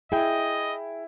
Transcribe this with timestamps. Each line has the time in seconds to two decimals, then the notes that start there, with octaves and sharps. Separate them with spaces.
0.12 E4 G#4 D#5 E5 G5